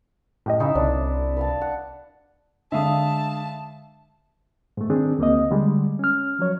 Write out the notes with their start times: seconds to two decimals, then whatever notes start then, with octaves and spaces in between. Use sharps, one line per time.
0.46 F#2 A2 G4 D#5
0.60 C#3 D#4 E4 E5
0.75 C2 C#4 D4
1.37 B4 F5 A5
1.62 F#5
2.72 D3 G#3 E5 F5 A5 D#6
4.77 G#2 A3
4.90 D#3 C4 D4 G#4
5.19 D2 A#3 C4 D#5
5.51 D3 G3 G#3
5.99 C#4 F6
6.39 F3 F#3 C#5